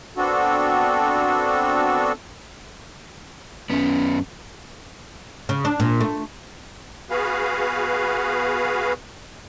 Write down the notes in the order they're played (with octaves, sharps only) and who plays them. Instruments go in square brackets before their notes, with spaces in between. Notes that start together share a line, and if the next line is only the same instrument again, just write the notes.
[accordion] B3 C4 D4 F#4 A4
[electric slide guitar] F#2 B3 [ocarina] C#4
[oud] C#3
D4
A#2
A3
[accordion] B3 F#4 G#4 B4 F5